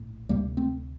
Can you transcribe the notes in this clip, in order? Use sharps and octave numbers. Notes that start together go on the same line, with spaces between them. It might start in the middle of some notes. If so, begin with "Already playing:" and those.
Already playing: A#1 A2
D2 C3 G3 A#3
A3 C4